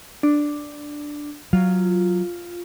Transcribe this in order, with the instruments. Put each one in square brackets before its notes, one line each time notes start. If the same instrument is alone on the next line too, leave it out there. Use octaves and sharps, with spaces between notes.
[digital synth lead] D4
[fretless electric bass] F#3 [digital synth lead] F4